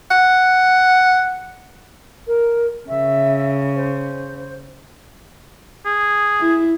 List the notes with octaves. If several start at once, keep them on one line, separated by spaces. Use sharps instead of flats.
F#5
A#4
C#3 E5
C5
G#4
E4